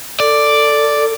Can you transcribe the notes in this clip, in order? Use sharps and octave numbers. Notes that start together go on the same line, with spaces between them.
A4 D5